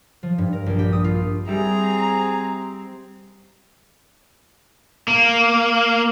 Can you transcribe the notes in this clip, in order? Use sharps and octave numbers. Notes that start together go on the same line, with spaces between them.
F3
G2
A#4
A#1
G4
D#6
F4
G3 C4 E4 G#4 A#5
A#3